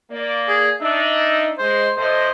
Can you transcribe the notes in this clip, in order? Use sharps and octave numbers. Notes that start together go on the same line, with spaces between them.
A#3 D5
G#4
D4 D#4 E5
G#3 C5
A2 A4 C5 D#5